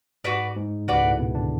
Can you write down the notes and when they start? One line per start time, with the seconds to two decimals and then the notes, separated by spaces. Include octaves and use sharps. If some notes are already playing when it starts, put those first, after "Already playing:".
0.24 G#2 F#4 B4 D5
0.56 G#2
0.87 C#2 C#3 F#4 B4 D5
1.03 A2 A3
1.20 B2 B3
1.35 D3 D4